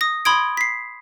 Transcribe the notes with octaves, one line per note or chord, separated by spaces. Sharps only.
D#6 A#6
B5 C6 D#6 G#6 D7
B6 C7